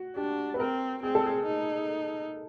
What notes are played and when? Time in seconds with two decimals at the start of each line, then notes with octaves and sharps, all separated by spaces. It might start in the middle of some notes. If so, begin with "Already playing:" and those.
Already playing: F#4
0.16 D4 G4
0.54 B4
0.59 C4 A#4
1.03 C4 G#4
1.15 A4
1.26 G#4
1.46 D#4